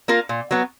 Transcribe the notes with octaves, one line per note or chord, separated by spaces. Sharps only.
A#3 F4 A#4
A#2
F#3 B3